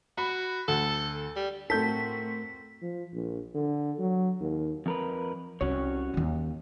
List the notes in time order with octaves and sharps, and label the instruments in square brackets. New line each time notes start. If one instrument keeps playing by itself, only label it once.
[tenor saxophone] F#4 [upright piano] B5
[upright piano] D2 [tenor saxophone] A4
[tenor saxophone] G3
[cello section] A2 C4 F#4 [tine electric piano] A3 A#4 [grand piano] A4 G6 [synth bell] B6
[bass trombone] F3
A#1
D3
F#3
D#2
[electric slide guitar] F2 A#4 B4
[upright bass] C2 [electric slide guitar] C#4 F#4 C#5
[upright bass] D#2 D#4